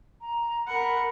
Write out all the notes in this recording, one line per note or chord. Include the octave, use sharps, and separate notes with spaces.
A#5
A#4 F#5 B5